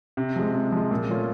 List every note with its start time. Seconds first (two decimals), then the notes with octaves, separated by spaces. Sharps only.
0.17 C3
0.36 F3 G#3
0.54 C3
0.72 F3 G#3
0.91 A#2
1.09 F3 A3 C#4 F4